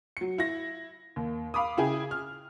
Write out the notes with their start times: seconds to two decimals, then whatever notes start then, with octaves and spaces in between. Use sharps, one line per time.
0.17 F#3 C#7
0.38 E4 A#6
1.16 D#2
1.54 F5 B5 D6 D#6
1.77 C#3 E4 G#4 G5 G#5
2.11 F6